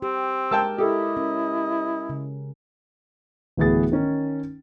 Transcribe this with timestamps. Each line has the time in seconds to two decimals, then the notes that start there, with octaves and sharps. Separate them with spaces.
0.02 C4 G4
0.51 G#3 A#4 G5 A5 E6
0.78 E4 G4 A4 D#5
1.17 C#4 A#4
2.09 C#3
3.57 D1 A2 E3 B3 G#4 A6
3.92 D#3 C#4 D#4